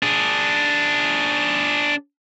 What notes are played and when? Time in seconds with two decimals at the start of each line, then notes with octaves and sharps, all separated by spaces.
0.03 D4 G#4